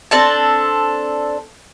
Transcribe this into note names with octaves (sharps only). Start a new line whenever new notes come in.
C4 D4 A4 A5